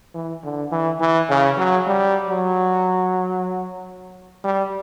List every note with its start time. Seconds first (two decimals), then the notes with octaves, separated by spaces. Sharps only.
0.15 E3
0.44 D3
0.72 E3
1.01 E3
1.30 C#3
1.58 F#3
1.87 G3
2.29 F#3
4.44 G3